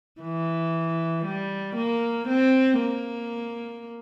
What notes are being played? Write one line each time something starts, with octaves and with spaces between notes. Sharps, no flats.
E3
G3
A#3
C4
A#3